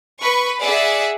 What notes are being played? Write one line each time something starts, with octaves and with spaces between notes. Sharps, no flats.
B4 C#6
G#4 D5 E5 F#5